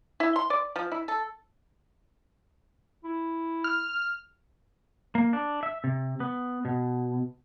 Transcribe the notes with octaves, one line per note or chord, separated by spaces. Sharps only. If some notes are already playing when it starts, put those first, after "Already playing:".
E4
C6
D5
F3
E4
A4
E4
F6
A#3
D4
E5
C3
B3
B2